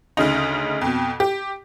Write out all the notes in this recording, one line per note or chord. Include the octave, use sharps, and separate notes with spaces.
D2 C#3 D#4
F2 B2
G4